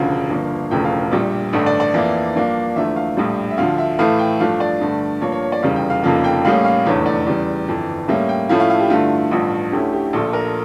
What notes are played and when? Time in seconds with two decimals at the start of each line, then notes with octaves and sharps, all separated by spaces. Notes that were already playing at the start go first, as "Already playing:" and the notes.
Already playing: E1 D2 C#3 F3 F5
0.30 G1 G2 F3 A#3
0.71 E1 E2 C#3 F3 A3 G5
0.85 F5
1.11 A#1 A#2 G3
1.53 A1 G2 D3 A3 D4
1.66 D5
1.80 D5
1.94 F2 E3 A#3 E4
2.35 G2 F3 A#3 D4
2.76 E2 D3 F3 A3 E5
2.96 F5
3.17 A#1 A2 G3
3.51 E5
3.58 D2 D3 F3 F5
3.78 E5
3.99 A2 E3 A3 E4 F5
4.19 G5
4.40 G2 F3 A3 D4 F5
4.60 D5
4.81 G2 D3 A3
5.21 G2 F3 A#3 C#5
5.32 C#5
5.42 C#5
5.52 D5
5.62 F1 E2 C#3 G3 F5
5.76 G5
5.90 F5
6.03 F1 F2 C#3 F3 A#3 F5
6.24 G5
6.44 A1 A2 G3 A#3 C#4 F5
6.65 F5
6.85 F1 E2 D3 A3 C#5
7.06 D5
7.27 E2 C#3 G3
7.68 G1 F2 E3
8.08 A2 G3 A#3 C#4 E5
8.29 G5
8.49 A2 F3 A3 C#4 E4 F5
8.60 F5
8.70 F5
8.80 G4
8.90 G2 D3 A3 E4 F4
9.31 A1 G2 F3
9.72 D2 D3 A3 C#4 E4 G4
9.93 G4
10.13 A#1 A#2 F3 A4
10.33 A#4